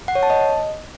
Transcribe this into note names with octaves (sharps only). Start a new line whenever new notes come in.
F#5
C#5
A5
D#5